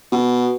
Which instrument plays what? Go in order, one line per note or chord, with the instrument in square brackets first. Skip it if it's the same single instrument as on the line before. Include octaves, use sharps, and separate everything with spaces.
[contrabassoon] B2